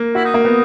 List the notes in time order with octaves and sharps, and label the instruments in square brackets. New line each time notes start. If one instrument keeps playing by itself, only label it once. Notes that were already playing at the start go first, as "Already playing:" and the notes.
Already playing: [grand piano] A#3
[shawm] E4 [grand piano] F#4
[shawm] D#4
[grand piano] A#3
[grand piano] B3 [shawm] D#4